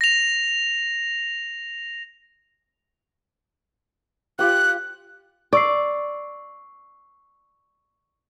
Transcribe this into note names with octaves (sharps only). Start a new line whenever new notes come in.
A#6 F7
F4 G4 G5 F#6
D5 C#6 E6 C7